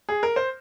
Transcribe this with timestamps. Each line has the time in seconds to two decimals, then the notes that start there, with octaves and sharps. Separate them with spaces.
0.09 G#4
0.23 A#4
0.36 C5